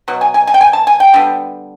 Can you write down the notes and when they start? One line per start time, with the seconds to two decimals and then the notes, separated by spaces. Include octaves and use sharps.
0.08 B2 F#3
0.21 G#5
0.34 G#5
0.47 G#5
0.54 G5
0.61 G#5
0.73 A5
0.87 G#5
1.00 G5
1.13 D3 G3 B3